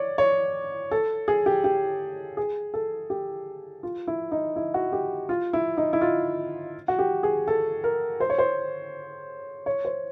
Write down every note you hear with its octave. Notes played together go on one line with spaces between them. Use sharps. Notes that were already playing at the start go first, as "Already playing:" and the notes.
Already playing: C#5 D5
C#5
A4
G#4
G4
G4
G#4
A4
G4
F4
E4
D#4
E4
F#4
G4
F4
E4
D#4
E4
F4
F#4
G4
G#4
A4
A#4
C5
C#5
C5
C#5
C5